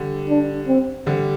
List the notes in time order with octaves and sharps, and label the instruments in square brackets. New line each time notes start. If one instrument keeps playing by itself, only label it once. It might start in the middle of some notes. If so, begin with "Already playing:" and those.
Already playing: [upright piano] D3 G3
[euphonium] D4
C4
[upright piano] D3 G3